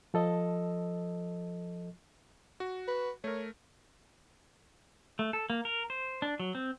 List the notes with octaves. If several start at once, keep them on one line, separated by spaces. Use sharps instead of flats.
F3 A4 D#5
F#4
B4
A3 A#4 C#5
A3
A4
A#3
A#4
C5
D4
F#3
C4